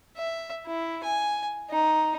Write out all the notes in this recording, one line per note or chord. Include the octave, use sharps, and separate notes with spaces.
E5
E4
G#5
D#4